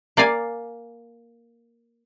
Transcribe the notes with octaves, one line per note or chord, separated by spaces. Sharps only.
A#3 D5 F5 G#5